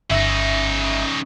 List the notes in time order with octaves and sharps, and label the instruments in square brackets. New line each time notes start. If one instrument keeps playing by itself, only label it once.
[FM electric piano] G1 E5 C#6 [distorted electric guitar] C#3 D#4